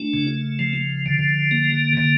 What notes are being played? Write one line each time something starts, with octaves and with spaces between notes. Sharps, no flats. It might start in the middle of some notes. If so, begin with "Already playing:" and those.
Already playing: A3 D4
C#3
F3
D3
A#3
D3